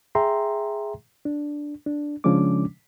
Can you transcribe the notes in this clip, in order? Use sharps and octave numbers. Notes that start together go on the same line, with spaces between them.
G#4 E5 G5 A#5 C6
D4
D4
C#3 F3 G#3 C#4 D4 D6